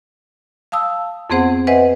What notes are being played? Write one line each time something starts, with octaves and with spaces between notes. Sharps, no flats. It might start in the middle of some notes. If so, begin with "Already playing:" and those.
F5 A5 D#6 E6
F2 B3 C4 G#4 C5 F#5
B4 C5 D#5 E5 F#5 G#5